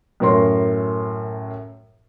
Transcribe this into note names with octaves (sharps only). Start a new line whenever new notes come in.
F#2 A2 A#4 C#5 C6